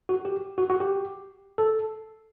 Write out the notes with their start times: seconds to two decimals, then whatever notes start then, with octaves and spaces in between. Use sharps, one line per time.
0.09 F#4
0.25 G4
0.58 F#4
0.70 F#4
0.80 G4
1.58 A4